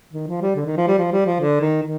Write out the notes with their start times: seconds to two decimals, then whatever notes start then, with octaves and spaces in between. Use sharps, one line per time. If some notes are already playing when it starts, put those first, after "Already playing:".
0.13 D#3
0.28 F3
0.42 G3
0.56 D3
0.66 D#3
0.77 F3
0.88 G3
0.98 F3
1.12 G3
1.26 F3
1.40 D3
1.61 D#3
1.82 D#3